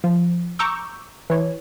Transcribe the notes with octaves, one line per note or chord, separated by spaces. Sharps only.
F3
A#5 C#6 D6 E6 G6
E3 C#5